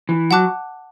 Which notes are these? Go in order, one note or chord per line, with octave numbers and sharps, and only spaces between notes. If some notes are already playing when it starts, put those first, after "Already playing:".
E3
F#3 F#5 A5 D6 F#6